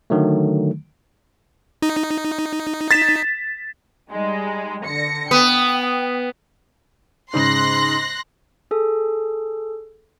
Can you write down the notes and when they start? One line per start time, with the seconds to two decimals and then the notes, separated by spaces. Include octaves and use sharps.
0.10 D3 D#3 F#3 A3
1.82 D#4
2.91 A6 B6 E7
4.10 G3 G#3 D#4
4.85 D3 A#6 C#7
5.31 B3 G5
7.34 G#2 C#3 C6 F#6 A#6 F#7
8.71 G#4 A4